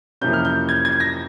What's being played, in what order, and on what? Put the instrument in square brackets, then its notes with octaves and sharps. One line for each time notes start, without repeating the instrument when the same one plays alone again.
[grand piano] F2 C3 E3 A#3 C#4 G6
F6
G6
G#6
G#6
A#6